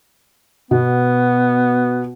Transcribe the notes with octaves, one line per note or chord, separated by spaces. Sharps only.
B2 B3